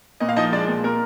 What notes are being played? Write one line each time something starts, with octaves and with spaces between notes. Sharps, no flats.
A#2 D#5
F5
F3 D#4 D#5
G#3 D4 D5
A#2
A#2 A#4